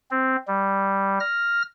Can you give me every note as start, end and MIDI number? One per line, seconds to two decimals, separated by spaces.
0.11 0.36 60
0.48 1.19 55
1.20 1.62 89
1.20 1.62 94